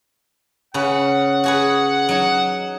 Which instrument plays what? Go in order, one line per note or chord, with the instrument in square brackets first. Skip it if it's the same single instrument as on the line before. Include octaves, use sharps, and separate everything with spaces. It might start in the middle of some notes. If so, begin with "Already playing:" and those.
[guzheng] C#3 C#4 B4 [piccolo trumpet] F#5
[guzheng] F#4 G#4 B4
F#3 D#4